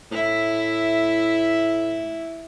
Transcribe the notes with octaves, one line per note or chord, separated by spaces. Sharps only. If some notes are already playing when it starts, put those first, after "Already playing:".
A2 E4 E5